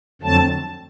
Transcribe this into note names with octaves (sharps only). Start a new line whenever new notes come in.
F2 D3 F#3 A3 C4 A5